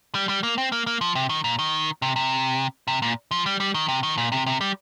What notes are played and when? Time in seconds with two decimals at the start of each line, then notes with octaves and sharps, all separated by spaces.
0.15 G3
0.29 G3
0.43 A#3
0.58 C4
0.72 A#3
0.87 A#3
1.01 F3
1.15 C3
1.29 D#3
1.44 A#2
1.59 D#3
2.02 C3
2.16 C3
2.88 C3
3.02 A#2
3.31 F3
3.46 G3
3.60 G3
3.74 D#3
3.88 C3
4.03 D#3
4.18 A#2
4.32 C3
4.46 C3
4.61 G3